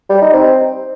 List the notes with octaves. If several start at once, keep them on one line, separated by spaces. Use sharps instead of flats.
G3
D#4
C4